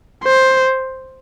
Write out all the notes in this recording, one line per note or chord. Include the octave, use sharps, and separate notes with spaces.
C5